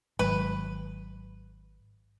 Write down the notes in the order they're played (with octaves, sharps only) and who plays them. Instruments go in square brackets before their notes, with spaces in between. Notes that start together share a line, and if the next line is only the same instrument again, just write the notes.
[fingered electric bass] G#1 [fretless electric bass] D#3 F#3 G#3 [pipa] B4